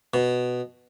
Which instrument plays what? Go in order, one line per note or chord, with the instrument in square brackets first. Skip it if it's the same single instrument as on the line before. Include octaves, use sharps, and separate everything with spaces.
[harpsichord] B2